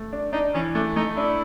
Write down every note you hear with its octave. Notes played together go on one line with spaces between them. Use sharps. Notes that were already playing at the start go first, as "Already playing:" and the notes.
Already playing: A3
D4
D4 D#4
E3 C#4
A3 D4
A3 D#4
D4 E4